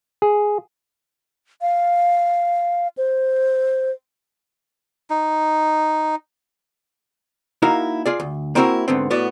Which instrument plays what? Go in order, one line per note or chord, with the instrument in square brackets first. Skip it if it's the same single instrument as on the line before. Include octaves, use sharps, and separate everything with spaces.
[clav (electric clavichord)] G#4
[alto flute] F5
C5
[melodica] D#4
[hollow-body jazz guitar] A#3 D#4 E4 F#4 A#4 F5
F4 G#4 D5
D2
A#3 C4 E4 F#4 G#4 A#4
D2 G#2 D3 B3 C4
A2 B3 F#4 D5